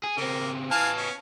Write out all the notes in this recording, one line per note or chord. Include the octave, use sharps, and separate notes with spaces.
G#4
C#3 A#3 C4
E3 B3 F5 G#5 A5
C#4